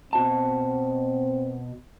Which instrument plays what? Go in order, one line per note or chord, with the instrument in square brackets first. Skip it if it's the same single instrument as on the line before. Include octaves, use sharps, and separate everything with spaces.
[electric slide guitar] B2 F#4 A5 [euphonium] C4